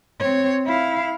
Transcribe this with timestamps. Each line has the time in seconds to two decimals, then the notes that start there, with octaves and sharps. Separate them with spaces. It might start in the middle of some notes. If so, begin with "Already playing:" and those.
0.20 C4 C#5
0.67 E4 F5